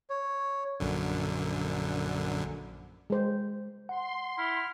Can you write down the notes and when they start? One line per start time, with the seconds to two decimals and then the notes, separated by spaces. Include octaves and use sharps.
0.10 C#5
0.80 A#1 F#2 D3
3.10 G#3 C5
3.89 F#5 C6
4.38 E4 F6